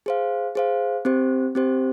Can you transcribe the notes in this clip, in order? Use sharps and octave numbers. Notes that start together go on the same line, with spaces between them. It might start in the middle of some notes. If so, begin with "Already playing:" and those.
G#4 C5 F5
G#4 C5 F5
C4 G4 C5
C4 G4 C5